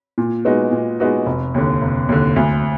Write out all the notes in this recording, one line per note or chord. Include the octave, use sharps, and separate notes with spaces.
A#2
G#3 B3 D#4 F#4
A#2
G#3 B3 D#4 F#4
F1
D#2 D3
F1
D#2 D3
D2